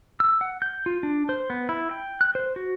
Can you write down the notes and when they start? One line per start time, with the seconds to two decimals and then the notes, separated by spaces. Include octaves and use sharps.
0.20 E6
0.41 F#5
0.62 G6
0.86 F4
1.03 D4
1.29 C5
1.50 B3
1.69 E4
1.91 G5
2.21 F#6
2.35 C5
2.56 F#4